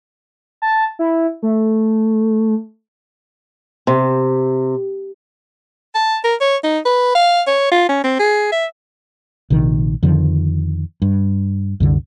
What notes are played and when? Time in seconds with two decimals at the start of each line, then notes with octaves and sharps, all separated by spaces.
0.62 A5
0.99 E4
1.43 A3
3.87 C3
5.95 A5
6.24 A#4
6.41 C#5
6.64 D#4
6.85 B4
7.15 F5
7.47 C#5
7.72 F4
7.89 C#4
8.04 C4
8.19 G#4
8.52 E5
9.50 A#1 C3 D#3
10.03 F2 D3 D#3 F3
11.02 G2
11.80 C2 F#2 D3